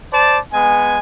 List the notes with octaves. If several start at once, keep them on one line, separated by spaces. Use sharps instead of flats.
C5 D5 A5
G#3 B3 G#5